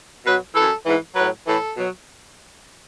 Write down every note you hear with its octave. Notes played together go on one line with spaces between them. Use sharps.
B2 F#3 B4
F#2 E3 A4
G#2 E3
A2 F#3 B4
A2 E3 A4
B2 F#3